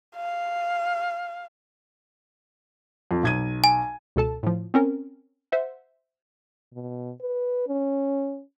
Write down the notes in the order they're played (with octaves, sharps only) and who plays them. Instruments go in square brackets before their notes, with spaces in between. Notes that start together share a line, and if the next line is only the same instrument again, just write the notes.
[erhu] F5
[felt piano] F2
B1 G#6 D#7
[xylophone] G#5
[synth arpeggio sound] C#2 B2 A4 A5
A2 F3
C4 C#4 A#4
C5 E5 F#5
[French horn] B2
B4
C#4